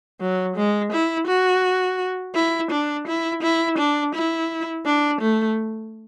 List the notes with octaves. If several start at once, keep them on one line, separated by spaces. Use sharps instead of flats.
F#3
G#3
E4
F#4
E4
D4
E4
E4
D4
E4
D4
A3